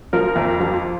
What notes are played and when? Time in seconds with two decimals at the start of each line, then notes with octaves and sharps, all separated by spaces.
0.13 F3 A#4
0.36 F2
0.60 F3